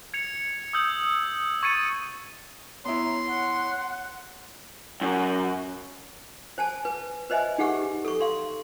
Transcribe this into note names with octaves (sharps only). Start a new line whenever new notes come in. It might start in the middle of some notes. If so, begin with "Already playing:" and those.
G#6 C#7 F7
D#6 E6 G6 F#7
C#6 G#6 A6 C#7 D#7
B3 E4 C#5 A#5 C6
F#5
F#2
C5 G#5 A5
B4
B4 C5 D#5 E5 G#5
D#4 G4 G#4 F#5 C#6
A4 C#6
F5 C6